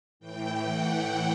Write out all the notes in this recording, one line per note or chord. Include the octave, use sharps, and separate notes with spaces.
A2 E3 G5
F#5